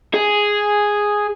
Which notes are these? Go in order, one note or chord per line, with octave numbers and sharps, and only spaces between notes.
G#4